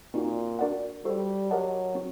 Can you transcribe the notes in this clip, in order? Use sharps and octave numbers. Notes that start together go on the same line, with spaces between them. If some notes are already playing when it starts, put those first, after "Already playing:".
A#2 C4 D#4 F#4
D4 F#4 A#4 D5 F#5
G3 F#4 A4 C5
F#3 G4 A#4 D#5 F#5 A5
C4 F#4